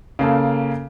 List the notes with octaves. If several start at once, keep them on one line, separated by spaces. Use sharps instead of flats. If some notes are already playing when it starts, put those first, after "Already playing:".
C#3 A#3 A4